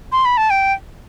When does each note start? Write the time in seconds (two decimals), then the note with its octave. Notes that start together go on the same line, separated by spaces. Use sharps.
0.12 C6
0.25 B5
0.37 A5
0.50 G5